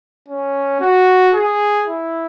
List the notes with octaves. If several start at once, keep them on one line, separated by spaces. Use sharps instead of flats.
C#4
F#4
G#4
E4